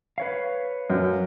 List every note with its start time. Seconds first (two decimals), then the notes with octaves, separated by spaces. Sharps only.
0.18 B4 C#5 F5
0.90 F#2